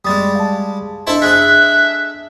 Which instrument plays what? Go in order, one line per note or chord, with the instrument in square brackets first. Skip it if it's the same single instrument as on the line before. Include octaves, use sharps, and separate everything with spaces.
[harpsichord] G3 G#3 [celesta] D#6 A6
[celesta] F5 A5
[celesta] D4 D#5 [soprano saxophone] E4 [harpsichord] A4 C5 A5
[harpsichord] G#4 A4 [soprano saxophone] E5 [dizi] F#6